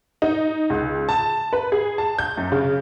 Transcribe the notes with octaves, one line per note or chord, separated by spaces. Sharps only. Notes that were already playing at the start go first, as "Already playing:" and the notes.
D#4
C#2
A5
B4
G#4
A5
G6
F#2
C#3